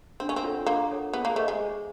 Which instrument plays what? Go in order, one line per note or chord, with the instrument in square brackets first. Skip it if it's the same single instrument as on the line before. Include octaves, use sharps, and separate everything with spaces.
[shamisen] C4 [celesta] D4
[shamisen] C#4
C4
[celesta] F4 A4 C#5 F#5
[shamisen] A#3 [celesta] D4
[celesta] F4 A4 C#5 F#5
[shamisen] B3 [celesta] G#4
[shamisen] A#3
[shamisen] A3 [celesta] C5 D#5
[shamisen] G#3
[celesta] G#4